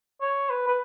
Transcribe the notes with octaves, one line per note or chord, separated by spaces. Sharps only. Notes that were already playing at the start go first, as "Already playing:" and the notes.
C#5
B4
B4